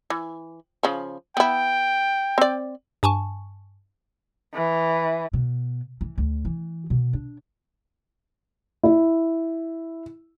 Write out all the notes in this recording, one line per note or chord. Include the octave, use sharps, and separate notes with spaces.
E3
C#3 F3
B3 E4 G5
C4 D5
G2 G#5 A5 C#6
E3
B2
E3
D2
E3
B2
D4
E4